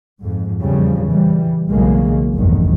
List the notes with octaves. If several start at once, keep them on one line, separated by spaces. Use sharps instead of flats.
F2 G#2
E2 A#2 C#3 F3 G3
E3 G3
B1 C#3 E3 F#3 G#3 A#3
F1 A#1 E2 G2 D#3